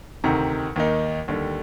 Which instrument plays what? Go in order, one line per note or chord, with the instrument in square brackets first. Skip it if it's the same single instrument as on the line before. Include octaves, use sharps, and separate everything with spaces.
[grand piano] D2 C3 D#3 A#5
D#2 D#3 A#3 D#4
D#2 D3 G3